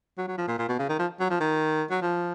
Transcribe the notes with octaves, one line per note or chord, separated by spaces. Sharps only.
F#3
F#3
F3
A#2
A#2
B2
C#3
D#3
F3
F#3
F3
D#3
F#3
F3